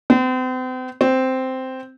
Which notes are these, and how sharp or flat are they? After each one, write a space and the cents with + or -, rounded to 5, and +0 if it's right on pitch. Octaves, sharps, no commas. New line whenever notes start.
C4 -40
C4 -5